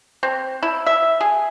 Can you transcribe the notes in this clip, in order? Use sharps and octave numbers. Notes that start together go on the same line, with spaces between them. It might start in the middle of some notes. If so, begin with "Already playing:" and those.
C4
E4
E5
G#4